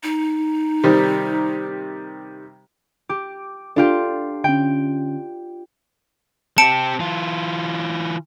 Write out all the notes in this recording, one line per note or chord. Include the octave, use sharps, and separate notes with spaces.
D#4
C3 D#3 G3
G4 D6
D4 F4 G4 A4
D3 C#4 G5
C4 G4 A5 C#7 D7
E3 F4